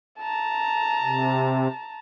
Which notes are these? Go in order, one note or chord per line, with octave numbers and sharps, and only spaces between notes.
A5 A#5
C3